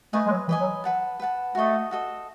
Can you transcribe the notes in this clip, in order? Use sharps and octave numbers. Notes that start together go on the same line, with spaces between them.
A3 B4 D#5 G#5
G#3
F#3
E3 B4 D#5 G#5
F#3
B4 F#5 A5
B4 F#5 A5
A3 F#4 A4 D#5
F#4 A4 D#5